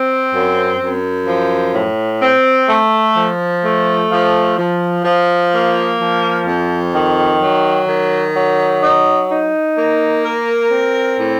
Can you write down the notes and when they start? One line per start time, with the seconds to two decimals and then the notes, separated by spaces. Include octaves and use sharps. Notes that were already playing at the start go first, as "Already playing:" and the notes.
Already playing: C4
0.34 F#2
0.80 F#2
1.27 F3
1.75 A2
2.22 C4
2.69 A3
3.16 F3
3.64 A3
4.12 F3
4.59 F3
5.05 F3
5.53 A#3
6.00 F3
6.47 F2
6.95 D#3
7.42 F#3
7.88 D#3
8.36 F#3
8.83 D#4
9.30 D#4
9.78 A#3
10.25 A#4
10.71 C4
11.20 A2